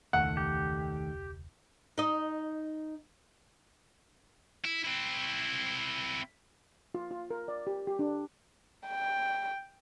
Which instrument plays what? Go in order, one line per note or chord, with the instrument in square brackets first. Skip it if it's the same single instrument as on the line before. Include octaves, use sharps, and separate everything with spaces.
[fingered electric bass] E1 C#2 [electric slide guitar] D#3 A3 A4 [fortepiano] F#5
[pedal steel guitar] G4
[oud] D#4 D#5
[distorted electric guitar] E4
C4 E4
[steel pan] F4
F4
A#4
D5
G4
G4
D4
[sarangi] G5